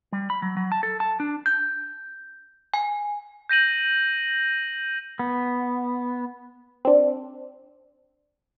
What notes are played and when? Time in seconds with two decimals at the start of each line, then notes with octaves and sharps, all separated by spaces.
0.12 G3
0.30 B5
0.42 F#3
0.57 F#3
0.72 A5
0.83 A4
1.00 A5
1.20 D4
1.46 G6
2.74 G#5
3.49 G6 A#6 D#7 F#7
5.19 B3
6.85 C4 D4